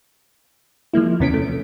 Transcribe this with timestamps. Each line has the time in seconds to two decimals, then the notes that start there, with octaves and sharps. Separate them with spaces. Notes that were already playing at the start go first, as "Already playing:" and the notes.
0.93 F3 G#3 A#3 E4
1.20 E2 C3 B3 C#4 B6 D7
1.34 A3